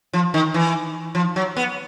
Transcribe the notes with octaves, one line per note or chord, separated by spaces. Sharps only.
F3
D#3
E3
F3
F#3
B3